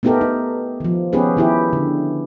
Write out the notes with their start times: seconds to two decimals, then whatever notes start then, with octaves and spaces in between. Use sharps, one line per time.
0.03 A3 B3 D#4 G4 A4 A#4
0.21 D#4
0.80 D#3 F3
1.13 B3 C#4 D#4 G4 G#4 B4
1.37 D#3 E4 G4
1.73 D3